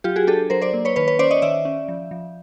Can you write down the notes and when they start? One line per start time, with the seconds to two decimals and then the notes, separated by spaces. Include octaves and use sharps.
0.04 F#3 F4 G4
0.16 F#4 G#4
0.27 D4 G4 A4
0.50 F#3 A#4 C5
0.62 C5 D5
0.73 A#3
0.85 B4 C#5
0.96 D#3 B4 C#5
1.07 B4 C#5
1.19 C#4 C5 D5
1.31 C#5 D#5
1.42 D#3 D5 E5
1.65 C#4
1.88 F3
2.11 F3